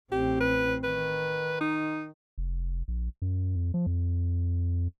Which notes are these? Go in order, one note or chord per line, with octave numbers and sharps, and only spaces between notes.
A1 C4 G4
B4
D#3 B4
D#4
F1
A#1
F#2
F2
F3
F2